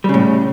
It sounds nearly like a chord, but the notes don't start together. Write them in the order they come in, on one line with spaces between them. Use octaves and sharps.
G3 C#3 A2